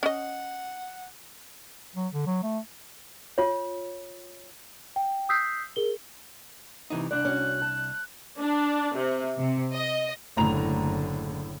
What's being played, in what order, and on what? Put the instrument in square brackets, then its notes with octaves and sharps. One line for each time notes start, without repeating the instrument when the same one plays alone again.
[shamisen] C#4 D#5 [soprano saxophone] F#5
[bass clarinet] F#3
D3
F#3
A3
[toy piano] F4 C#5
[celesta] G5
D#6 E6 G6 B6 C7
G#4 A#4 G7
[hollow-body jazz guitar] C3 E3 D#4
[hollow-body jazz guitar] C2 D4 [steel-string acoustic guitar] D5 [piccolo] F#6
[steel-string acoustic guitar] C#4 F#4
A5
[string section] D4
C3
C3
D#5
[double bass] F#1 D3 [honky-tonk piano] A2 A#5 F7